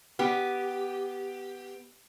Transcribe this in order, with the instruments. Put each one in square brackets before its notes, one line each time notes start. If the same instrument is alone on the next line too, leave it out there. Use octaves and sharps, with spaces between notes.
[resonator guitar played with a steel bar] B3 G4